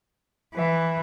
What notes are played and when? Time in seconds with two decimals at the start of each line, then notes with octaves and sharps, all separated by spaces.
0.55 E3 B4 E5